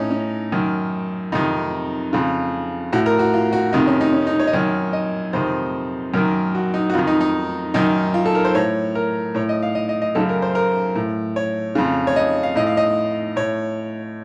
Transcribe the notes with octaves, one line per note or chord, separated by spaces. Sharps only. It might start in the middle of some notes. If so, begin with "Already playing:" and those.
Already playing: A2 C#4 D#4
C#4
F#2 D#3
F2 C3 D#3 D#4
F2 C#3
A2 F#4
A#4
F#4
F4
F#4
F2 C3 D#3 D#4
C#4
D#4
C#4
D#4
C#5
D#5
F#2 D#3 C#5
D#5
F2 C3 D#3 C5
F#2 D#3 A#4
F#4
D#4
F#4
F2 D#3 F4
D#4
D#4
F#2 D#3 D#4
F4
A4
A#4
C5
A2 C#5
A#4
A2 C#5
D#5
F5
D#5
D#5
D#5
F#2 C#3 A4
A#4
C5
A#4
A2
C#5
F2 C#3
C#5
D#5
F5
A2 D#5
F5
D#5
A2 C#5